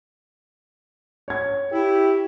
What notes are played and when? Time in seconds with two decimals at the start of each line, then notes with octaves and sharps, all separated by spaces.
1.28 C#5 G#6
1.72 E4 G4